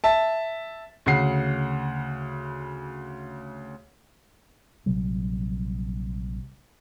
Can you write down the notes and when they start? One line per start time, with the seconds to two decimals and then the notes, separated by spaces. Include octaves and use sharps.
0.04 E5 A5
1.06 D2 C#3 F#5 C7
4.86 A#1 C3 F#3 G3